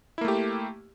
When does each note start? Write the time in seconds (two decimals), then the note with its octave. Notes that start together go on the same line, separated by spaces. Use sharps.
0.18 E4
0.21 A#3
0.25 A3
0.28 G4